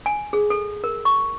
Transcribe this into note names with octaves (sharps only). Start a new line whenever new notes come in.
G#5
G#4
A4
A#4
C#6